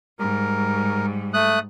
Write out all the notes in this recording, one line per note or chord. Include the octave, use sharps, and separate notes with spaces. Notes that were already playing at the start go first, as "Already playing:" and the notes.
G#2 G3 A#4
A3 D#6 F#6